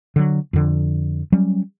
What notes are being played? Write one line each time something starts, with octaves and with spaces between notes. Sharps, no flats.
D3 F#3
F2 D3
F#3 G3 C#4